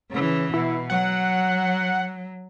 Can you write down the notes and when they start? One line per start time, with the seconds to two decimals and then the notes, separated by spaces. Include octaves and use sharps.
0.11 C#3 E3
0.54 B2 E4
0.90 F#3 F#5